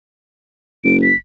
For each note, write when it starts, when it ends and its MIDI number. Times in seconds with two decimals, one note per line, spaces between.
0.84 1.10 30
0.84 0.97 98
1.02 1.15 95